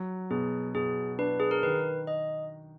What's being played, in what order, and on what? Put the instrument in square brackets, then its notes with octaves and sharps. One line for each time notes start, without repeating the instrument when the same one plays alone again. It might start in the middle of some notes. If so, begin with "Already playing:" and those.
Already playing: [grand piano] F#3
[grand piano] B2 [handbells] G#4
[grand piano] B2 [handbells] G#4
[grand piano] D4 [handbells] B4
[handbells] G#4
A#4
[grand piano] D#3 [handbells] B4
[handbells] D#5